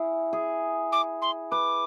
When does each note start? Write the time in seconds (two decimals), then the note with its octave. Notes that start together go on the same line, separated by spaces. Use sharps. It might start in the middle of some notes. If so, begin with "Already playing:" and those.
Already playing: E4 G#4
0.33 G#4
0.92 D6
1.22 C6
1.51 B4 D6